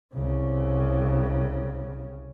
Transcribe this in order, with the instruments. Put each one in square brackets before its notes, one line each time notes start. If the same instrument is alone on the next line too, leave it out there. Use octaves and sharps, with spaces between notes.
[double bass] C2 C#3